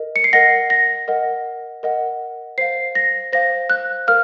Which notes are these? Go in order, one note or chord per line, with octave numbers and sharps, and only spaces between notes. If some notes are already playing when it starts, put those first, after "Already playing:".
Already playing: A#4 D#5
C#7
C7
A#4 D#5 F#5 A#6
A#6
A#4 D#5 F#5
A#4 D#5 F#5
C5 F5 C7
A#6
C5 F5 A#6
F#6
A#4 F5 F6